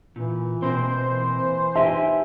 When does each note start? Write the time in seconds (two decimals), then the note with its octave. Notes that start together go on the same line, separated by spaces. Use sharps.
0.16 A#2 E3
0.62 B2 A#3 C4 C5
1.06 E3
1.75 D#4 G4 E5 G#5